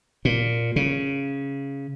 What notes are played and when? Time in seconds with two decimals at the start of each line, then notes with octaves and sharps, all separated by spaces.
0.25 A#2
0.76 C#3